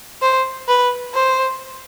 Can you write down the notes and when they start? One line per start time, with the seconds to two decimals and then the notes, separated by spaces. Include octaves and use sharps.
0.22 C5
0.68 B4
1.14 C5